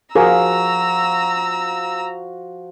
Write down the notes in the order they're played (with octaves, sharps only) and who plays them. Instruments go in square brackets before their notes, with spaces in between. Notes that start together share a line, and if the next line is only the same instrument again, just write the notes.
[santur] F3 F#4 [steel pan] G#4 A#4 [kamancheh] A#5 E6